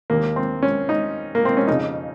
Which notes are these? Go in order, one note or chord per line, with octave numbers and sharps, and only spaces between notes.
D#2 D#3 A#3
C4
C#4
D#4
A#3
C4
C#4
F2 C#3 D#4